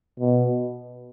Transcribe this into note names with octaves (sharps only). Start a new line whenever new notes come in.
B2